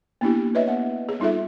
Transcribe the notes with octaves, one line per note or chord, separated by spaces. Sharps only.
A#3 B3 D4 E4 G4
B4 C#5 D#5 E5
B3 F#5
G#4
G3 D#4 F4 A4 E5